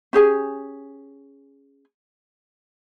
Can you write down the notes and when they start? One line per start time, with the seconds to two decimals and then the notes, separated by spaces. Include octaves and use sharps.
0.13 C#4 G4 G#4 G#5